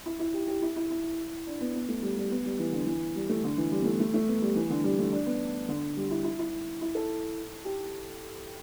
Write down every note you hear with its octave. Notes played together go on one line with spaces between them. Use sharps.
E4
E4
G4
G4
E4
E4
E4
D4
B3
B3
A3
G3
G3
B3
G3
E3
D3
E3
G3
A3
D3
E3
G3
B3
A3
A3
A3
B3
G3
E3
D3
G3
A3
D4
B3
D3
G3
E4
E4
E4
E4
A4
G4